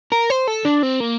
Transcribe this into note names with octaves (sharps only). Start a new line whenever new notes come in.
A#4
C5
A4
D4
C4
A#3